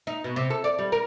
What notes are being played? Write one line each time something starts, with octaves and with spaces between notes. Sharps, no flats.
D#4
B2
C3
A4
D5
G3
A#4